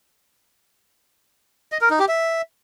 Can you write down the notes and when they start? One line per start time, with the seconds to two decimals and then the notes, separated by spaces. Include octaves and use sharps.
1.72 D#5
1.81 A#4
1.90 D#4
1.99 G4
2.08 E5